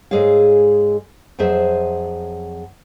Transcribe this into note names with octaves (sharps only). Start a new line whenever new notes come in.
G#2 G#3 G#4 A4 C#5 F5
F2 F#3 G#4 C5 E5